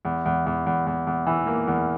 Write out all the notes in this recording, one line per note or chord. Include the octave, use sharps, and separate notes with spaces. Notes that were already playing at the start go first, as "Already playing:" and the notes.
E2
E2
E2
E2
E2
E2
E3
A#3
E2